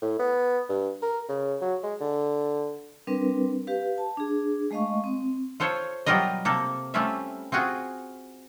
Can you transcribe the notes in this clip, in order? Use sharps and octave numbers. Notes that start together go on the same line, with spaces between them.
A2
B3
G2
A#4
C#3
F#3
G#3
D3
G3 C4 D4 A#4 B4
G4 B4 F5
A5
D4 G#4
G#3 A3 D#5 F5 C#6
C4
F4 A4 C5 C#5
B2 F#3 G3 F4 A#4 D#5
C3 A#3 A4
G3 A3 C4 C#4 F4 E5
C4 F4 F#4 G#4